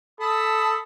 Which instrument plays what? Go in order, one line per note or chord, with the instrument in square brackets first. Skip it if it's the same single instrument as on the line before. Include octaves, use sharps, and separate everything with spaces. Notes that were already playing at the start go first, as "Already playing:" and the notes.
[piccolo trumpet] A4 [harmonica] A5 B5 D#6